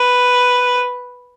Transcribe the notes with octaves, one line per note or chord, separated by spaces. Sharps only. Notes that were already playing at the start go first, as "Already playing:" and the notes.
Already playing: B4